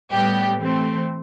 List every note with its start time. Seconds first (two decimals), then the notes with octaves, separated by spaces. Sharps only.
0.12 A2 G3 B3 G4
0.59 E3 A3 C4